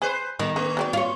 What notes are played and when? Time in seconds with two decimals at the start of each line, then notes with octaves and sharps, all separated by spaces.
0.02 G#4 B4 C5
0.39 D#3 G3 B3
0.56 D3 A#3
0.77 F#3 C4 D5
0.93 F4 C#5